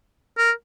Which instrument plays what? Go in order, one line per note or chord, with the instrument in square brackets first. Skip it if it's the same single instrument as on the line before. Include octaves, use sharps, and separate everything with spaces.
[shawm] A#4